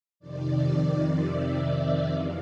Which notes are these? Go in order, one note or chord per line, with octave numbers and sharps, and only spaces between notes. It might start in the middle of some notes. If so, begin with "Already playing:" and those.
F2 C3 D#3 D5
E5
F2 C#3 E3 G#3 F5